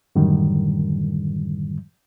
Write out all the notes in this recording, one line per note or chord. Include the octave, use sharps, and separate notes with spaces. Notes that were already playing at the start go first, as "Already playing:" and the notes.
F#2 A2 D3 D#3 G3